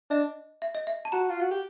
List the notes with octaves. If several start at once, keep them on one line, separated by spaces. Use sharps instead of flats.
D4 D#5
E5
D#5
E5
A5
F#4 A#5
F4
F#4
G4